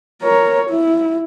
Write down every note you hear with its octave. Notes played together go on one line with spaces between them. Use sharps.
A#4 C#5
E4